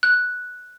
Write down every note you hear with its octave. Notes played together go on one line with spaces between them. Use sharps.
F#6